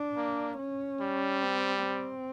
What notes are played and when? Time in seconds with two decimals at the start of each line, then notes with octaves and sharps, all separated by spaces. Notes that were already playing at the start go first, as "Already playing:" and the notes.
Already playing: D4
0.17 A#3
0.59 C#4
1.01 G3
1.43 C4
1.85 C4